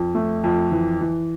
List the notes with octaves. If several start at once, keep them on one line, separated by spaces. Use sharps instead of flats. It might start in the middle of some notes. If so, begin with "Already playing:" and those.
Already playing: F2
A3
F2
E3
E3